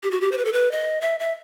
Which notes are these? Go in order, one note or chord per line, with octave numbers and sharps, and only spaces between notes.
G4
F#4
G4
C5
B4
A4
B4
D#5
E5
E5